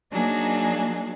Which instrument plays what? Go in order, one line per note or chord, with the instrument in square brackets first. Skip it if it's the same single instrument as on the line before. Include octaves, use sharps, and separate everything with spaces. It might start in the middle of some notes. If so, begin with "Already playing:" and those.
[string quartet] F#3 A#3 D4 D#4 G#4